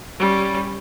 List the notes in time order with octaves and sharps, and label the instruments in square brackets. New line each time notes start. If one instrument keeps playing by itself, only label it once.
[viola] G3 C#4